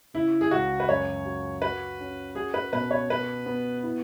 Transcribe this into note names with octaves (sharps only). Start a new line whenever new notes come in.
C#3 E4
G#4
C#2 F#4
B4
F#2 C#5
F#4
F#4 B4
C#4
F#4 G#4
B4
B2 B4
C#5
B3 B4
B3
E4